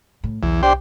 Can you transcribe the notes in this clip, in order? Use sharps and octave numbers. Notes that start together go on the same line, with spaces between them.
A2
B1 E2 D3
D4 G4 C5 G5